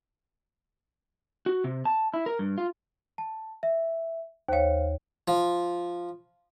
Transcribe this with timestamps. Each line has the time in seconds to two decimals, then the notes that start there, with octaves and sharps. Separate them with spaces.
1.46 F#4
1.64 C3
1.85 A5
2.14 E4
2.26 A#4
2.39 G2
2.58 F4
3.18 A5
3.63 E5
4.48 D#2 C5 C#5 F5
5.28 F3